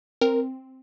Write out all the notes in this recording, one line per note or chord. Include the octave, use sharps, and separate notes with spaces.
C4 A#4